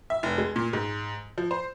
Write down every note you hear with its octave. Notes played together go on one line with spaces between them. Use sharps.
E5
F1
G#3
A#2
G#2
F3
C5